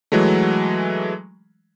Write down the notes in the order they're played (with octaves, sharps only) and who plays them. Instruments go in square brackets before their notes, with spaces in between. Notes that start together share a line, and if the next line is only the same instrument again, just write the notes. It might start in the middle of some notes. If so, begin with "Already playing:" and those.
[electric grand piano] E3 F#3 G#3 A3